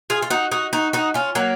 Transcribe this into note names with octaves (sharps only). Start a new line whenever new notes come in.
F4 G#4
F4
D#4 F#4
D#4 F#4
D#4 F#4
D#4 F#4
C#4 F4
F#3 A#3